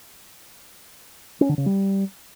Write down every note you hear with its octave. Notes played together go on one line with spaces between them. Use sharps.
C#4
D3
C#3
G3